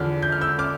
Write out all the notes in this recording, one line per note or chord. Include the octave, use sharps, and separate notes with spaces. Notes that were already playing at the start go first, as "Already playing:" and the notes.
Already playing: E2 D3 F3 F6
G6
F6
E6 G6
D6 F6